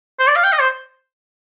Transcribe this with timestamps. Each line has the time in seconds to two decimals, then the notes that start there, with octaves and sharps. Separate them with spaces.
0.19 C5
0.28 D5
0.35 F5
0.44 G5
0.52 D#5
0.60 C5